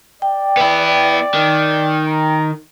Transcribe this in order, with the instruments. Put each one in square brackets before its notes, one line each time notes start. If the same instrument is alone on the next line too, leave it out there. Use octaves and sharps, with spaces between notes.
[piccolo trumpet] D5 [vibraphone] G5
[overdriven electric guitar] B3 E4
D#3
[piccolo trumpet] A#5